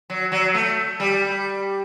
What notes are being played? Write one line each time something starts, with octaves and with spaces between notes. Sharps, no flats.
F#3
F#3
A3
G3